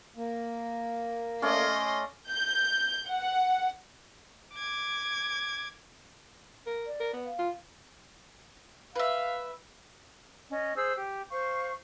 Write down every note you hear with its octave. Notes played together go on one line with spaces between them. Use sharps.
A#3
A3 C#4 D5 D#5 C6
G6
F#5
D6 G#6
A#4
D5
A#4
B3
F5
F4
B4 E5 F5
C#4 D#5
G#4 C5 E6
G4
C5 F5 C#6